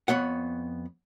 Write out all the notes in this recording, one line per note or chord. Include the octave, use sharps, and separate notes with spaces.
F2 B3 C#5 F#5